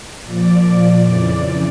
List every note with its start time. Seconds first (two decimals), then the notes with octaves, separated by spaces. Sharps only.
0.24 A#2 F3 D5
1.03 F2 C#3 E3